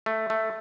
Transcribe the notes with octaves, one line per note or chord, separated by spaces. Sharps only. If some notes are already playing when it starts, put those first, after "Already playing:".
A3
A3